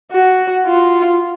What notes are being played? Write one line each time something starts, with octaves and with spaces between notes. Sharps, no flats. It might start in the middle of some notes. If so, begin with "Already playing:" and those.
F#4
F4